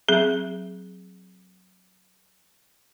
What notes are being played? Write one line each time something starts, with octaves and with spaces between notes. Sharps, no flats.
F#3 C4 G#4 E5